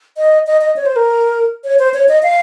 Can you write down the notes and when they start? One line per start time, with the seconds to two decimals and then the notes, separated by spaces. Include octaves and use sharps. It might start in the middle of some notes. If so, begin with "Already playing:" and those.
0.18 D#5
0.47 D#5
0.61 D#5
0.76 C#5
0.86 C5
0.96 A#4
1.64 C#5
1.79 C5
1.94 C#5
2.09 D#5
2.23 F5